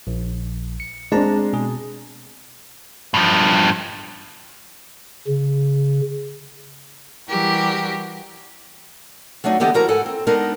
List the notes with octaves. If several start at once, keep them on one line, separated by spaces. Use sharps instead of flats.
A#1
C#7
G#3 C4 D4 D5 A5 A#5
B2 G#4
G2 F3
C#3
E3 G3 F#4 G4 A#4
F#3 A3 D4 D#4 F#4
D3 E3 B3 G4 A4 D#5
F3 E4 F#4 A#4 F#5 A#5
G#2 A4 F#5 G#5
C4
G#3 B3 D4 D#4 A#4